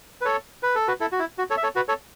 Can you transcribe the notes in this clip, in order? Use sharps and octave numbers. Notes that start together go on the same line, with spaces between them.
B4
A4 C#5
B4
A4
F#4 B4
E4 A4
F#4
E4
F#4
A4 C#5
E5
A4 C#5
F#4 B4
A4 C#5